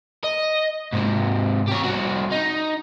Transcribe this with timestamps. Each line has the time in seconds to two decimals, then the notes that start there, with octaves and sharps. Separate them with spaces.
0.24 D#5
0.93 G#2 C3
1.68 G4 C#5
1.82 C2 F#4
2.32 D#4